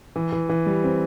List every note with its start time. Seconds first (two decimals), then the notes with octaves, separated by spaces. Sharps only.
0.16 E3
0.32 E3
0.49 E3
0.66 G3
0.84 C4